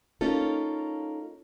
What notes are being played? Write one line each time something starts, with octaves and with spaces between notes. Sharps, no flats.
A#3 C#4 D#4 F4 A4